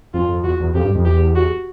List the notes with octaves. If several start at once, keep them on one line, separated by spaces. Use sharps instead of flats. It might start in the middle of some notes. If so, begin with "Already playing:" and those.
F2 F4
F2
E2 F#4
E2
F2 G4
G2
F2
E2 G4
F#4